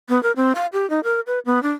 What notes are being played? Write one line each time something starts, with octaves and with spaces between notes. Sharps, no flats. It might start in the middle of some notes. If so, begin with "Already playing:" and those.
B3
A#4
C4
F5
G4
D#4
A#4
B4
B3
D4